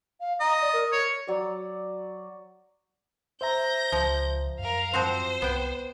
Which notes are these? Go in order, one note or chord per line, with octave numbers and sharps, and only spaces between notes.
F5
D#5 A#5
D5
A#4
C#5
F#3 D5
C5 E5 A#5 G6 A#6
C#2 F3
F#2 A#4 F5
F3 C4 F#4 C5 C6
C2 B3 G5